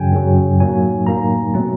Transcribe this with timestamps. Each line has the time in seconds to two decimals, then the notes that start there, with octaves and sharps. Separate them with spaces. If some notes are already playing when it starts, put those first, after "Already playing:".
Already playing: F#2 C#3 F#3 G5 G#5
0.13 F#2 C#3 F#3
0.60 A2 F#3 A#3 D#4 G#5
1.07 A2 F#3 A#3 D#4 A#5
1.54 B2 F#3 A3 C4